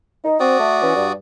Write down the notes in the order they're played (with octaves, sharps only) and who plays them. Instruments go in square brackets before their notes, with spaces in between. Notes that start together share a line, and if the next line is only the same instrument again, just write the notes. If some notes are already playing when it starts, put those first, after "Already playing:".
[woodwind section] D#4
[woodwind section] C4 [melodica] F#4 D5 D#6
[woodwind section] A3
E3 C#4
G2